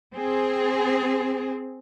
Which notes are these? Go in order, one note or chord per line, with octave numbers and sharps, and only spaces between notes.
C4 G#4